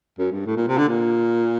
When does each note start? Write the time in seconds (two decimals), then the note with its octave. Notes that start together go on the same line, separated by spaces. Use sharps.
0.19 F#2
0.32 G2
0.46 A2
0.57 A#2
0.68 C3
0.78 D3
0.88 A#2